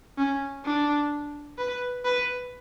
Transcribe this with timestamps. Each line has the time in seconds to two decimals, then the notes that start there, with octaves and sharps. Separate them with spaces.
0.18 C#4
0.65 D4
1.58 B4
2.05 B4